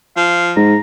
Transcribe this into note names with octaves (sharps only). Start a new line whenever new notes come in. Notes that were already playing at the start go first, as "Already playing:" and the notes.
F3 F5
G#2 A#5